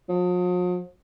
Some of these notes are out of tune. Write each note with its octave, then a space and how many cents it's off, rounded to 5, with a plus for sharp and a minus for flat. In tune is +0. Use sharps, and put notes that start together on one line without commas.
F3 +45